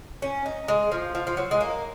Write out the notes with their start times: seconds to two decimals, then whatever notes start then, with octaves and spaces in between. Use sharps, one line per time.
0.22 C#4
0.46 D#4
0.68 G#3
0.92 F3
1.15 F3
1.27 F3
1.37 F#3
1.51 G#3
1.61 A#3